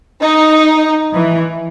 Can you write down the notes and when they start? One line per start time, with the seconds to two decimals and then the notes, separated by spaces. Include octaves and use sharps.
0.23 D#4
1.15 E3